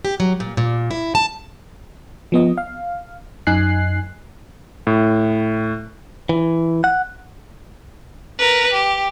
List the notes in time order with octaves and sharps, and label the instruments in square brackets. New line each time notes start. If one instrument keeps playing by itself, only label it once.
[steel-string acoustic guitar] G4
F#3
A#2
A#2
E4
A5
[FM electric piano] F3 B3 D#5
F5
F#2 D#4 G#5 F#6 C7
[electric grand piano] A2
[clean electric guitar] E3
F#5
[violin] A#4 B4
G4